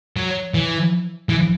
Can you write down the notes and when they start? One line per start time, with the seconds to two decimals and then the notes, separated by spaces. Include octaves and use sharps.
0.17 F#3
0.54 E3
1.29 E3